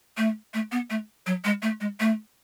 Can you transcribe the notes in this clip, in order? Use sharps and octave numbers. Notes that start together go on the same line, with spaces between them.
A3
A3
B3
A3
F#3
G#3
A3
G#3
A3